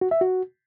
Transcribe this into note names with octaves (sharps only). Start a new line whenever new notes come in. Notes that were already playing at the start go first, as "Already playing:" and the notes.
F#4
E5
F#4